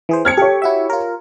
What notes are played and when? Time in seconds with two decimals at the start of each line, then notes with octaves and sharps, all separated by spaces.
0.09 E3 G#4 C5
0.25 C4 F6 G#6 C#7
0.37 G4 A4 C#5
0.62 E4 F#4 E5
0.90 F4 A#4